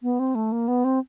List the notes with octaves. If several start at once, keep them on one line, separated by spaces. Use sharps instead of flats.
B3
C4
A3
A#3
B3
C4